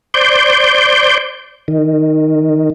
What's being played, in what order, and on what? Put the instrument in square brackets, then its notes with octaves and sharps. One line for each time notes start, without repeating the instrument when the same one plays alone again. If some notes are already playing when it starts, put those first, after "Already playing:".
[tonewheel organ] C5 D5 G6
D#3